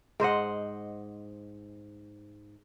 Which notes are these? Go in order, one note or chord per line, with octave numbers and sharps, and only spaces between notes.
G#2 C5 D#5 F#5